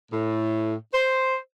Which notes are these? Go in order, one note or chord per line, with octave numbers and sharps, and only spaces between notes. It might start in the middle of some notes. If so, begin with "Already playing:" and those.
A2
C5